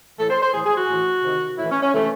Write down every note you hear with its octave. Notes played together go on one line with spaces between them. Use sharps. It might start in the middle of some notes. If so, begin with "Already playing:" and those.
A2 E3 A4
C5
C5
A2 E3 G#4
G#4
F#4
A2 E3
C3 D#3
A2 E3 E4
C#4
C#4
C3 E3 A3